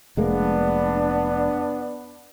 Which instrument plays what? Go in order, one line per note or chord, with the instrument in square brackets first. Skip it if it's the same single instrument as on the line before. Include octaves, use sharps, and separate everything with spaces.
[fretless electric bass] F1 G#3 A#3 [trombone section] B3 D4